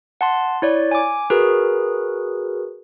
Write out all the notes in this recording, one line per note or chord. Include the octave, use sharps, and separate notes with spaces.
F#5 A5 C6
E4 C#5 D5
G#5 D6
F#4 G#4 A#4 B4